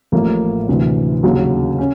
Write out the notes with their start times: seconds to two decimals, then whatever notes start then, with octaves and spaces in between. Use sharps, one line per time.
0.12 A1 A2 F3 A#3
0.69 D2 C3 E3
1.23 D#2 C#3 F#3
1.78 C#4